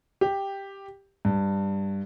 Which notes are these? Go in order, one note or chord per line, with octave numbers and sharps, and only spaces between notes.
G4
G2